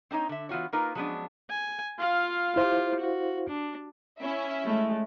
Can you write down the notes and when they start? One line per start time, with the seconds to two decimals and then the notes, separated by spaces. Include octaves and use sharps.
0.11 C4 D4 D#4 C#5 D#5
0.29 D3 E5
0.49 E3 B3 F4 F#4 C#5
0.73 A#3 D#4 F4 A#4 B4
0.95 F3 F#3 G#3 B3 C#4 D4
1.50 G#5
1.99 F4 F5
2.56 E4 F4 G4 C5 F5
3.00 F#4
3.49 D4
4.21 C#4 E4 E5
4.65 G#3 A3